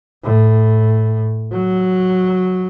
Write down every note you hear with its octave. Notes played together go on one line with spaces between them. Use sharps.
A2
F#3